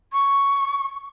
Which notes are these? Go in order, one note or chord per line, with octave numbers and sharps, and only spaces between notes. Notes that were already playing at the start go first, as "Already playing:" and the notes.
C#6